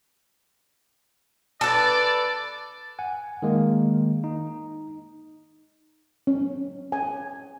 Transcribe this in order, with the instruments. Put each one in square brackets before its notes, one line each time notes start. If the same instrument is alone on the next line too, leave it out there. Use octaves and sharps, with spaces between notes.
[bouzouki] A4 B4 [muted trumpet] D5
[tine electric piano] F#5 G#5
D#3 G#3 A#3
D#4
[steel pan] C#4
G#5